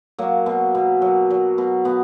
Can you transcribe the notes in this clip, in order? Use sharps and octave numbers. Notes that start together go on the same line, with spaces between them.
F#3 A#3
B2
B2
F#3
F#3
B2
B2 B3